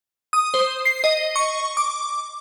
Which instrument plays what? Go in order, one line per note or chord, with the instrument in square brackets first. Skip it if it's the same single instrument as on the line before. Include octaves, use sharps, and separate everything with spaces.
[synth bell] D#6
C5
C7
D#5
C#6
D6